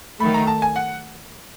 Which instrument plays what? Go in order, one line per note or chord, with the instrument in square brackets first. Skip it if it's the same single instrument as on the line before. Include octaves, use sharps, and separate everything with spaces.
[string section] D#3 F#3 A3 [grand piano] B5
[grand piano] A#5
A5
G#5
F#5